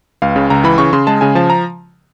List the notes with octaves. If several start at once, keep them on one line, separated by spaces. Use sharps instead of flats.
C#2 F5
C#3
C#2 A#5
E3 B5
C#3 C#6
C#3 C6
G#3 A5
C#3 G#5
F3 A5
A#5